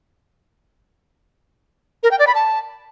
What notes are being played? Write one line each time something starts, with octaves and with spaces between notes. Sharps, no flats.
A#4
G5
D5
B5
A5